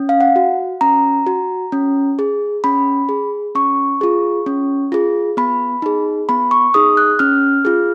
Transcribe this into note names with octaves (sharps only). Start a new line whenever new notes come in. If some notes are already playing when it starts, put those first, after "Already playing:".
Already playing: C#4
F5
F#5
F#4
C#4 A#5
F#4
C#4
G#4
C#4 B5
G#4
C#4 C#6
F4 G#4
C#4
F4 G#4
B3 B5
D#4 G#4
B3 B5
C#6
D#4 G#4 D#6
F#6
C#4 F6
F4 G#4